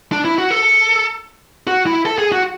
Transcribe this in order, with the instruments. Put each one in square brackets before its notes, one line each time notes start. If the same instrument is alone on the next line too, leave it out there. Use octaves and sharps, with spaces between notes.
[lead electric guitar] D4
E4
F#4
A4
F#4
E4
A4
G#4
F#4